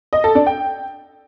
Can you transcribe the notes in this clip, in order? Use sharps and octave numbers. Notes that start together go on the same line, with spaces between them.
D#5
A4
D4
G5